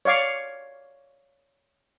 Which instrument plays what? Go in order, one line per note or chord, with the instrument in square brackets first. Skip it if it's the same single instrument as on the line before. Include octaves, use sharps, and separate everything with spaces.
[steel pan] C#5 D5 F5 D6